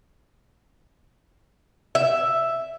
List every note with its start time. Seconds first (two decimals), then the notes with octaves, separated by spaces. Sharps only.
1.95 E5